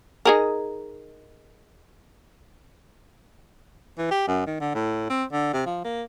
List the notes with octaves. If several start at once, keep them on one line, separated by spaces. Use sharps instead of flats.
D#4 G#4 A#4
E3
G4
F#2
D#3
D3
A2
C4
D3
C3
F3
A#3